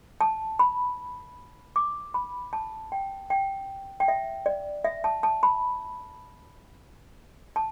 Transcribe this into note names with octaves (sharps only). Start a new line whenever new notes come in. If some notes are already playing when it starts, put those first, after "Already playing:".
A5
B5
D6
B5
A5
G5
G5
G5
E5
D5
E5
A5
A5
B5
A5